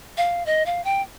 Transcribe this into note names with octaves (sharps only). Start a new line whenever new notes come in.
F5
D#5
F5
G5